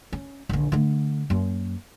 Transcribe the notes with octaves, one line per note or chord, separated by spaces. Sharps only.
C#4
A#1 D3
D3 A3
F#2 A#3